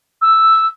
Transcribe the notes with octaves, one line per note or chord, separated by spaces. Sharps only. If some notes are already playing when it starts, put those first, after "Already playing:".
E6